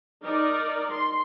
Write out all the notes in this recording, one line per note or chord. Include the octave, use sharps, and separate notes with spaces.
D#4 A#4 D5
C6